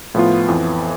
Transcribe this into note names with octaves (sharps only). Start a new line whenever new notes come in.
A2 F3 B3 F4
F2 E3 B3